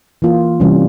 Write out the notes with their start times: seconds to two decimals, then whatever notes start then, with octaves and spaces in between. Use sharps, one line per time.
0.22 E3 A#3 F4
0.60 C3 E3 G3 C#4